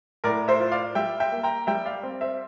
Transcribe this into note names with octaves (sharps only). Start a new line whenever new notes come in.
A2 A#4 D5
C5 E5
F4
D5 F5
G3 E5 G5
E5 G5
A#3
G5 A#5
G3 E5 G5
D5 F5
C4
C5 E5